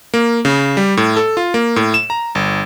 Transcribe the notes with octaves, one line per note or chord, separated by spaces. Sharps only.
A#3
C#3
G3
A2
A4
F4
A#3
A2
E7
A#5
G1